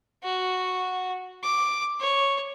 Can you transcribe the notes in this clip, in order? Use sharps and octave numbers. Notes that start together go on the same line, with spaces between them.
F#4
D6
C#5